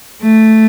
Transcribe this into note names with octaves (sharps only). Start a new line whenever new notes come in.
A3